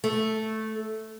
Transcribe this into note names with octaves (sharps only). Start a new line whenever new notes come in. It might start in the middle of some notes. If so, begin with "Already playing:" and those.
A3